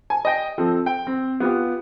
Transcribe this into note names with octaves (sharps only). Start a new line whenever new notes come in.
G#5
D#5 G5
F3 C4 A4
G5
C4
B3 F4 G4